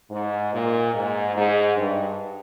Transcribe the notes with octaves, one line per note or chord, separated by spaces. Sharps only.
G#2
A#2
G#2
G#2
G2